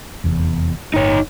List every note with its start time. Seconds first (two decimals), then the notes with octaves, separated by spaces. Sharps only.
0.24 F1 E2
0.94 G1 A2 D#4 C#5